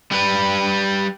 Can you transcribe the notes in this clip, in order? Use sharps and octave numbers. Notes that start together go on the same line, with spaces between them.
G3 B4